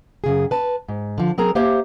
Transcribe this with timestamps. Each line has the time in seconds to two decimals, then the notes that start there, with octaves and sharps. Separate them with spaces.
0.24 F#2 C#3 G#4
0.51 B4 A5
0.88 G#2
1.18 D3 F3
1.38 F#3 C4 G#4 A#4 A#5
1.55 A#3 G4 C5 E5